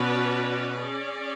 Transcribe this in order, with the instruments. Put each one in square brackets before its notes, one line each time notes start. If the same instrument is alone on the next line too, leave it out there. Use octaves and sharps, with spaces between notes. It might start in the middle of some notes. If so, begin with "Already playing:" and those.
Already playing: [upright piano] B2 B3 [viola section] C#4 F#4 B4 D5
[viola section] C#4 G#4 D5